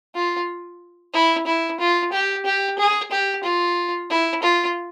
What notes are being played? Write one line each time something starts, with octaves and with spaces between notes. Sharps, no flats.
F4
E4
E4
F4
G4
G4
G#4
G4
F4
E4
F4